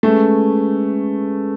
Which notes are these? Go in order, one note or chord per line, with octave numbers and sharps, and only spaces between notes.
G#3 A3 C#4 G#4 B4